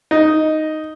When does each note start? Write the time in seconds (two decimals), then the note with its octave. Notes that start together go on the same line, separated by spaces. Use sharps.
0.11 D#4